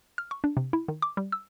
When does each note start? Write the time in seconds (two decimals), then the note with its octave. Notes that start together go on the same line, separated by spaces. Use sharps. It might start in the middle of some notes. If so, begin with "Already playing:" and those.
0.18 F6
0.31 C#6
0.44 D4
0.57 C3
0.73 E4
0.88 D#3
1.02 D6
1.17 G3
1.32 E6